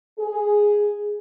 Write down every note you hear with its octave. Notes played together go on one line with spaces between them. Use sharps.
G#4